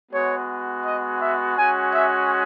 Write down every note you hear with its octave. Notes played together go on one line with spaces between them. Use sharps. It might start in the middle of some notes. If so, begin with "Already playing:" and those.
G#3 B3 F#4 C#5
D#5
E5
G#3 C#4 F#4 G#5
E5